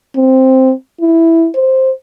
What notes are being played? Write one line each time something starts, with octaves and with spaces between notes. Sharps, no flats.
C4
E4
C5